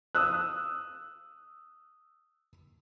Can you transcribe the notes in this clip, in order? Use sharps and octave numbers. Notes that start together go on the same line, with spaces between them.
D#6 E6 F#6